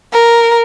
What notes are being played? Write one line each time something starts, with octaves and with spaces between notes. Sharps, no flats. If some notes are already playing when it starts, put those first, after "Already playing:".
A#4